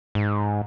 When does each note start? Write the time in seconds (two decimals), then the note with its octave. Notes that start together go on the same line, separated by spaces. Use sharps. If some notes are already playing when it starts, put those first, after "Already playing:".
0.15 G#2